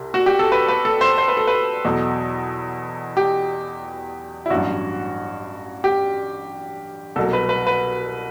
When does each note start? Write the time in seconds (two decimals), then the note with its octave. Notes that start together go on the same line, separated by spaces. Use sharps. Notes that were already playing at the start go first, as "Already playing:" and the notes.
Already playing: C2 C3
0.14 F#4
0.26 G4
0.39 A4
0.52 B4
0.68 B4
0.85 A4
1.01 C5
1.18 C5
1.28 B4
1.37 A4
1.47 B4
1.85 E2 B2 F#3 A4
3.17 G4
4.46 E4
4.50 A1 G2 F#3 F#4
5.84 G4
7.16 C2 B2 F#3 A4
7.33 B4
7.49 B4
7.67 B4